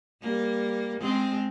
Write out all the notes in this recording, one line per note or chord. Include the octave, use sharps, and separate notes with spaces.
G3 A#3
G#3 C4